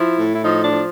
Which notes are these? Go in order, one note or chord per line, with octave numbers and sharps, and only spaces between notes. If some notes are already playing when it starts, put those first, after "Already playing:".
Already playing: F3 E4
A2
E4
F3 D#4
D4
F3